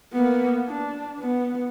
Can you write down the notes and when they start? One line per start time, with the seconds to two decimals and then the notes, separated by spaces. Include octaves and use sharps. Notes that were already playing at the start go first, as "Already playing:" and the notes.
0.13 A#3 B3
0.68 D4
1.19 B3